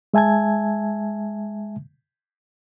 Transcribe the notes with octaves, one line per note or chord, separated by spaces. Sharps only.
G#3 E5 G#5 A5 G#6